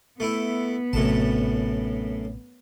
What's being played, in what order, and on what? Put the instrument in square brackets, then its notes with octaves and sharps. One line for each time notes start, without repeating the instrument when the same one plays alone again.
[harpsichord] A3 E4 [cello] B3
[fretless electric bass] A1 C3 [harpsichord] F#2 A2 A5